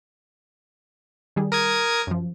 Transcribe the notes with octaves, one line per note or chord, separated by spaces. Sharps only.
D#3 G3 G#4
A#4 D#6 G#6
F#2 F3